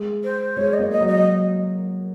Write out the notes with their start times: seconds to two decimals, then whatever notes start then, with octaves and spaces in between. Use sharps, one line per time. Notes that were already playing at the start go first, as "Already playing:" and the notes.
Already playing: G#3
0.23 C5
0.56 G#3 C#5
0.73 D#5
0.79 A#3
0.90 D#5
1.01 F#3
1.07 D#5